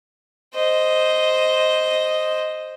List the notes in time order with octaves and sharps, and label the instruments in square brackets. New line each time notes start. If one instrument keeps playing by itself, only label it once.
[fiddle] C5 D#5